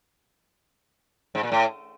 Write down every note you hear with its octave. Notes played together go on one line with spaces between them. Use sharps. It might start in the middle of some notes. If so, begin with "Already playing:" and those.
G#2
A#2
A2